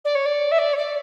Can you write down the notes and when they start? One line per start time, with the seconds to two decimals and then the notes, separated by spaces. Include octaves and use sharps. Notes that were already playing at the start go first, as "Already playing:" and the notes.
0.04 D5
0.15 C#5
0.25 D5
0.51 E5
0.58 D5
0.73 C#5
0.76 D5